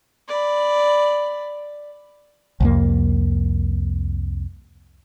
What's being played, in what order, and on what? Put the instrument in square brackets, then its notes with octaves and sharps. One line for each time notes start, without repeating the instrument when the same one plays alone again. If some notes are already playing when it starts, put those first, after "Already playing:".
[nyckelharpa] D5 B5
[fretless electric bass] C2 F2 A#3